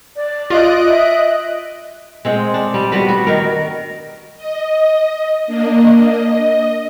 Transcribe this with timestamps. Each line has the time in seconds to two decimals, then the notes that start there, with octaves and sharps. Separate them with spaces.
0.16 D5
0.50 F4 D#5 F#6 D7
0.88 E5
2.25 G#3 C4 F#5
2.54 D4
2.74 G3
2.92 G3 B3 F#4 B4
3.09 F#4
3.27 D#3 A#4
4.37 D#5
5.47 A#3 D4 D#5
6.03 D#5